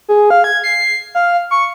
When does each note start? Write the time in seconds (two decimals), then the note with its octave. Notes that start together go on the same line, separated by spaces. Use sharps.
0.09 G#4
0.30 F5
0.44 G#6
0.64 C7
1.15 F5
1.51 C#6